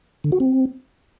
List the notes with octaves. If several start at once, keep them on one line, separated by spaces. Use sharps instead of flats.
D3
F#4
C4